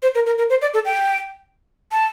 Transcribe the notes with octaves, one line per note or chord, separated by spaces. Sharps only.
C5
A#4
A#4
A#4
C5
D5
A4
G5
A5